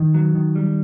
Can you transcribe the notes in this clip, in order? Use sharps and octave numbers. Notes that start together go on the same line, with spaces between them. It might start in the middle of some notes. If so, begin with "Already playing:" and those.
Already playing: D#3
F#3
D#3
G3